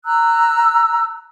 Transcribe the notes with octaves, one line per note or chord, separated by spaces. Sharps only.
A#5 E6 F#6